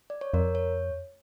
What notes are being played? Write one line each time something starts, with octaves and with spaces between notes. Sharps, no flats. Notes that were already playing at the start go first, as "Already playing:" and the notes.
D5
C#5
F2 A#4
C#5